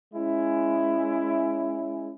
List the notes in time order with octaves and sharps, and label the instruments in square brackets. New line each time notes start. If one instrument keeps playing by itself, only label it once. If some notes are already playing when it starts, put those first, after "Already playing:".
[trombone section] G#3 C#4 E4